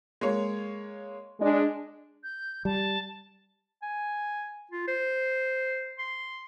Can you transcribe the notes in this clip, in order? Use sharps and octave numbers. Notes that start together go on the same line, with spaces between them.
G#3 A#3 C#5
G#3 D4
G6
G3 A5
G#5
F4
C5
C6